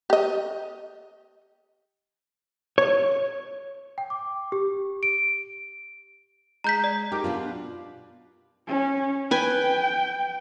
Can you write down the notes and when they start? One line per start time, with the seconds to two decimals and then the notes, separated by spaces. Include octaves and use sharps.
0.10 G4 D#5
2.78 C#5
3.98 G5
4.10 D6
4.52 G4
5.03 D7
6.64 G#3 A#5 G6 B6
6.84 D5
7.12 D#4 G4 A#4 D6
7.24 B2 B3 D4 F4
8.67 C#4
9.31 B4 G5 G#5